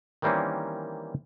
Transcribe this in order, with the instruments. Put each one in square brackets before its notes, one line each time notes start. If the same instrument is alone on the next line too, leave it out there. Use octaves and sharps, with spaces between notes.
[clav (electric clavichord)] D#3 E3 G3 A#3 C4 C#4